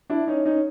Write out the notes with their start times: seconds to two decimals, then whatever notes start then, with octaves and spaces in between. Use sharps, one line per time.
0.10 D4 E4
0.28 C#4 D#4
0.46 C#4 D#4